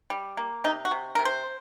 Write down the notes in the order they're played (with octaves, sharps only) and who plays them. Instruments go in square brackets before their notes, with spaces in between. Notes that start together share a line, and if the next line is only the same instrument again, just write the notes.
[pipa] G3
A#3
C3 D#4
F#4
C3
C3 A#4
C5